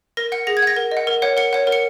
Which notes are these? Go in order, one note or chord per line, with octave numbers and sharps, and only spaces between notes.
A#4 A#6
F#5 C#7
G#4 A#6
G#6
F#5 A#6
A#4
D#5
F#5
A#4
C#5 F#5
A#4 C#7
C#5 F#5
A#4
C#7